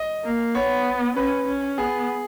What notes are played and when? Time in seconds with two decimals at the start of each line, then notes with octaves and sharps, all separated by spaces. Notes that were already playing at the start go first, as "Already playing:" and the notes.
Already playing: D#5
0.24 A#3
0.55 B3 C#5
1.16 C#4 B4
1.47 C#4
1.78 B3 G#4